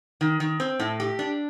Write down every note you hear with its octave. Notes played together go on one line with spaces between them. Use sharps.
D#3
D#3
C4
A2
G4
D4